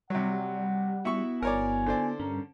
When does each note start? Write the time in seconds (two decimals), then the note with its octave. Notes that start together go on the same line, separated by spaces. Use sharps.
0.10 C3 F#3 G3 F#5
1.05 B3 E4 F#4 E5 C#6
1.43 G1 A#4 C#5 D5 G#5
1.86 D3 C5 D5
2.20 G2 C#4 A#4